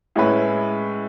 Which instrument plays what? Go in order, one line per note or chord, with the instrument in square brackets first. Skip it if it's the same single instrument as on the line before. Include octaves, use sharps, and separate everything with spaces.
[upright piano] A2 G#3 C#4 E4 B4